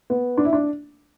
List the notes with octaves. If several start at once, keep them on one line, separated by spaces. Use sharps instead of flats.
B3
D4
E4
D4